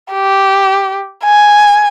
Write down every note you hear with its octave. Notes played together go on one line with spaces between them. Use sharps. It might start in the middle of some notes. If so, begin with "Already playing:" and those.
G4
G#5